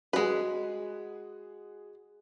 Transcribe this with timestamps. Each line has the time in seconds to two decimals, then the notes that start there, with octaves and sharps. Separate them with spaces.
0.13 G#3 F#4 G#4 B4